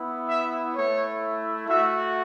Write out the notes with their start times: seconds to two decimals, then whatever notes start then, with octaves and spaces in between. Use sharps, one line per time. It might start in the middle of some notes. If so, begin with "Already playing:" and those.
Already playing: B3 E4
0.28 E5
0.74 A3 E4 C#5
1.67 A3 F#4 E5